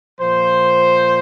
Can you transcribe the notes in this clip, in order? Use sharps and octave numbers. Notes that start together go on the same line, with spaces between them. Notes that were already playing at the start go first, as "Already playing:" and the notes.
A#2 F3 C5